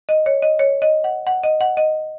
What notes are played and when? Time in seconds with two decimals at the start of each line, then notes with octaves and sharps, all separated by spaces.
0.09 D#5
0.26 C#5
0.42 D#5
0.59 C#5
0.82 D#5
1.04 F#5
1.27 F#5
1.43 D#5
1.61 F#5
1.77 D#5